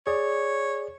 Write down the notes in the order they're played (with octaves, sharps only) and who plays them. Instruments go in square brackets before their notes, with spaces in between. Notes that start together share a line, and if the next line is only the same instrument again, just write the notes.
[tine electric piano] G#4 D5 [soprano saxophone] C#5